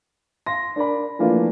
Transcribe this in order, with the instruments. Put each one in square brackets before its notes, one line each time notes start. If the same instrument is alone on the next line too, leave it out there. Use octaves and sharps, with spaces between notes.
[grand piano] F5 C6 A#6
D4 A#4 D5 B5
E3 F3 A3 A#3 D4 F4